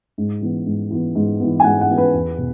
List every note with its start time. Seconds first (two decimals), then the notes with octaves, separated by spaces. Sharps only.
0.18 G#2
0.41 E3 B3
0.66 G#2
0.91 E3 B3
1.15 G#2
1.40 E3 B3
1.60 G#5
1.64 G#2 F#5
1.81 F#5
1.89 E3 B3
1.98 B4
2.14 E2
2.38 B2